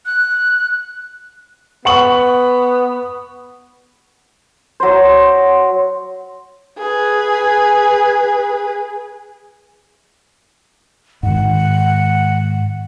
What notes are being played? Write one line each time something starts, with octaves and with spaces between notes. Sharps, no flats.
F#6
B3 F#5 C#6 F#7
F#3 C5
G#4 B4
G#2 D#3 F#5